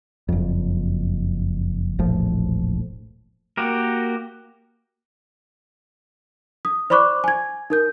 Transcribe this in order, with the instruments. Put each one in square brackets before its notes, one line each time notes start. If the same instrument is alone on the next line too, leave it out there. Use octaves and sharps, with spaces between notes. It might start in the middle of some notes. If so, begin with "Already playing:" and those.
[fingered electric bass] F#1 F2
E1 A#1 A2 F3
[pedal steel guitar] A#3 F#4 G4 A#4
[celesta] D#6
C5 D5 B5 C#6 D6 F#6
G#5 G#6
D#4 A#4 G6